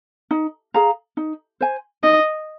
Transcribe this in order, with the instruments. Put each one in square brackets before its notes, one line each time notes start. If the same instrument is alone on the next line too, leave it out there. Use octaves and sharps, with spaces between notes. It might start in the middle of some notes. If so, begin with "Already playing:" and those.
[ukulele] D#4
G#4 F5 A#5
D#4
C5 G#5
[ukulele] D#4 [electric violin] D#5